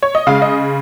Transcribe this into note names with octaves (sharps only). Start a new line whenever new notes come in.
C#5
D#5
C#3 G#3 F5
D#5